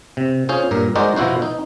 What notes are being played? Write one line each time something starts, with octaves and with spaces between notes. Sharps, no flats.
C3
C#4 F4 G#4 C5
G2 A#2 A#4
G#3 D#4 F#4 A#4 C5 D5
B2 F3 E4 F#4 C5
D#4